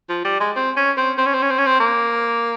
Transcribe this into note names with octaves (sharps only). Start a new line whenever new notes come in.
F3
G3
G#3
C4
C#4
C4
C4
C#4
C4
C#4
C4
C#4
C4
A#3